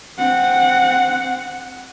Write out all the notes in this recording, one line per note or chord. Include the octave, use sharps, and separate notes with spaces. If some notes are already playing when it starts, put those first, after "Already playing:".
C4 F#5